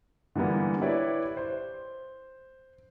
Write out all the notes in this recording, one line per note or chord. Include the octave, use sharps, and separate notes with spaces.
D3 E3 G3 A#3 B3
E4 G4 B4 C#5 D5
C5